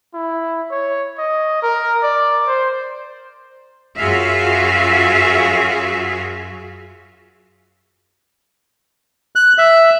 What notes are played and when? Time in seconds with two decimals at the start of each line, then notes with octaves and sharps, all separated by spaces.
0.14 E4
0.71 C#5
1.18 D#5
1.63 A#4
2.03 D5
2.47 C5
3.98 F#2 F4 F#4 G#4 E5 F5
9.36 F#6
9.58 E5